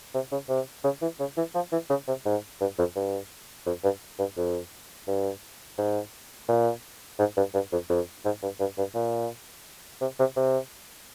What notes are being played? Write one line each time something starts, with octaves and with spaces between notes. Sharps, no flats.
C3
C#3
C3
C#3
E3
C#3
E3
F3
E3
C#3
C3
G#2
G2
F2
G2
F2
G2
G2
F2
G2
G#2
A#2
G#2
G2
G2
F2
F2
G#2
G2
G2
G2
A#2
C3
C3
C3